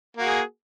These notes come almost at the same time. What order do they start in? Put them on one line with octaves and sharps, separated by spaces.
A#3 F#4 G#4